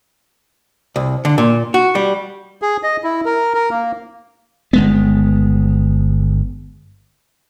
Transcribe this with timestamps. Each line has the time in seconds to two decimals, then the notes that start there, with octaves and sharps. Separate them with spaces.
0.96 C2
1.25 D3
1.38 A#2
1.74 F#4
1.95 G3
2.62 G#4
2.83 D#5
3.04 E4
3.25 A#4
3.54 A#4
3.70 A#3
4.73 G1 G#3 B3